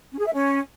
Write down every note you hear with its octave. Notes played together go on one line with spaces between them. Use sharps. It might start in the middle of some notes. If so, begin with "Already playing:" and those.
C#4
G#4
E5
C#4